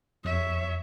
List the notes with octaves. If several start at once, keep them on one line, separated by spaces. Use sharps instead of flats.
F2 C#5 E5